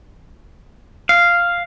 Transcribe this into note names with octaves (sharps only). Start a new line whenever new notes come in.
F5